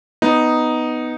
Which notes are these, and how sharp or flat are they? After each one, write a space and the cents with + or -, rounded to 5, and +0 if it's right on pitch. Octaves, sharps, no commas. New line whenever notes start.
B3 +5 D#4 +0